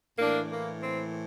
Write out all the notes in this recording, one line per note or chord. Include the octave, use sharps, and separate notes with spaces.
A2 E3 A#3 D4
A#3
C4